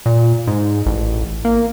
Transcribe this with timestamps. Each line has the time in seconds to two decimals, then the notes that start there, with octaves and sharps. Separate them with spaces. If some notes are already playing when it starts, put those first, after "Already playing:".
0.06 A#2
0.47 G#2
0.86 A1
1.45 A#3